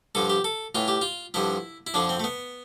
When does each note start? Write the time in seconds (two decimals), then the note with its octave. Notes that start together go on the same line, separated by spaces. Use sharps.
0.15 G2 D3 F3 A4
0.30 G4
0.44 A4
0.75 A2 E3 F4
0.88 G4
1.01 F4
1.34 G2 D3 F3 E4
1.87 E4
1.94 F2 D3 F3 D4
2.09 C4
2.20 A3
2.24 B3